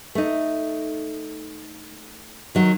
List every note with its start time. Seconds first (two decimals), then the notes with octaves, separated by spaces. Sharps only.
0.15 A3 D#4
2.55 D#3 F#3